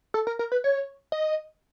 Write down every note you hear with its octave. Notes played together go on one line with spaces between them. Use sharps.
A4
A#4
A#4
B4
C#5
D#5